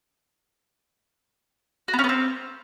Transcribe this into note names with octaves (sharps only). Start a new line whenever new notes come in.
F#4
B3
C#4
B3
C4